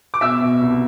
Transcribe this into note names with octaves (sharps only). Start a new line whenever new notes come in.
D6
B2 E5 E6
B2
C2